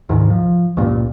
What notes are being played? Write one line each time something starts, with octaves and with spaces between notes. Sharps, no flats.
D2 G#2 C3 D#3
F3
C#2 G2 A#2